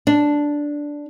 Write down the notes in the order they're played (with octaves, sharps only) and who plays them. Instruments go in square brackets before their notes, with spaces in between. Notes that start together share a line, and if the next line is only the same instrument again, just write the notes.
[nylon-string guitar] D4